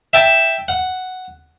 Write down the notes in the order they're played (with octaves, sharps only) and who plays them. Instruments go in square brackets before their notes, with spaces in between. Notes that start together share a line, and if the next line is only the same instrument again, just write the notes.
[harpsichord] E5 G5 A5
F#5